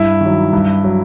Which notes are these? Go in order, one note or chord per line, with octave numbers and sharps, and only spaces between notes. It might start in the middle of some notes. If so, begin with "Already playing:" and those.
Already playing: G2 E4
D#3 F#3
G2
F#3